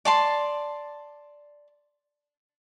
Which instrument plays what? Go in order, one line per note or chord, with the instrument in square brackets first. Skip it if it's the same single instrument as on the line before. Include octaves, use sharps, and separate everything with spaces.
[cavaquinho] D5 A5 C6